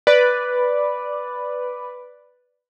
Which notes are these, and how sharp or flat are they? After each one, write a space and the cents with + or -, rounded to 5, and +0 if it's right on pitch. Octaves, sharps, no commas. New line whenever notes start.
B4 +0 D5 +0